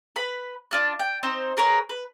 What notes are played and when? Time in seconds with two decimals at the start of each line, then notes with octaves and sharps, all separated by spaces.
0.16 B4 B5
0.71 D4 F4 F#6
0.99 G5
1.23 C4 D#4 C5
1.57 G#4 A#4 B4 C#5
1.89 B4